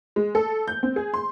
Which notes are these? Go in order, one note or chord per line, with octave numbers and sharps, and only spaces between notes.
G#3
A4
G6
C4
G#4
C6